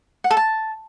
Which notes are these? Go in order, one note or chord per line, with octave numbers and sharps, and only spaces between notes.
F#5
A4
A5